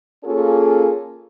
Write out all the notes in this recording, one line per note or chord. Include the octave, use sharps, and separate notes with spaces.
A#3 C#4 F4 G#4 A4